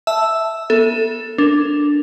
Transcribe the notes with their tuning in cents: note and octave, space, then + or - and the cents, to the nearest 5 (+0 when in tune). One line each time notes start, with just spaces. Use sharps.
E5 +0 A5 +0 E6 +0
B3 -35 A4 +10
D4 +0 A#4 +0